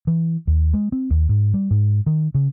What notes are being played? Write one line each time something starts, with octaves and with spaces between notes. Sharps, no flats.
E3
D#2
G#3
C4
D#2
G#2
G3
G#2
D#3
C#3